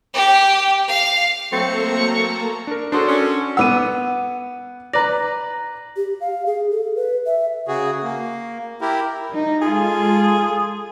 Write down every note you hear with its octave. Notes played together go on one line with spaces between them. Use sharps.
G4
F5
F#3 A3 A#3 C4 A4 A#5 C#6
D4 A#4
C#4 D4 F#4 G#4 A4 C5
C#4
B3 F#5 D6 E6 D#7
B4 D5 A#5 A#6
G4
F5
G#4
A4
B4
E5
C#3 F#4 G#4
A#3
E4 G4 A#4
D#4
G#3 F4 G#4 A4